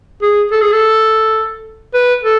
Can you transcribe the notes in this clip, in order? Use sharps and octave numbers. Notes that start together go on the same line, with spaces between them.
G#4
A4
G#4
A4
B4
A4